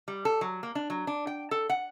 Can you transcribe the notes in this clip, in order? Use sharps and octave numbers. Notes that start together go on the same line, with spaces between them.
G3
A4
F#3
A#3
D4
F#3
D4
G5
A4
F#5